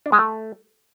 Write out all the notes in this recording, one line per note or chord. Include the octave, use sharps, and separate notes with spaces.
D4
G#3
A3